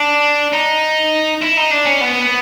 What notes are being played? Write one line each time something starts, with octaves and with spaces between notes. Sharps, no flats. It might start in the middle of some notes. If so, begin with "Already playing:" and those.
Already playing: D4
D#4
E4
D#4
D4
C#4
B3